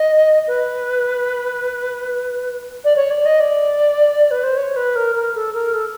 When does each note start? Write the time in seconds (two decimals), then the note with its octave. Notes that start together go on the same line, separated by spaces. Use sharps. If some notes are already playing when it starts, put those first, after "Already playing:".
Already playing: D#5
0.47 B4
2.84 D5
2.96 C#5
3.10 D5
3.25 D#5
3.40 D5
4.31 B4
4.43 C5
4.57 C#5
4.76 B4
4.95 A#4
5.15 A#4
5.35 A4
5.54 A#4
5.73 A4